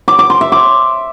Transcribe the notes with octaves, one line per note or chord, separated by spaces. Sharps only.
D6
D6
C6
E5
D6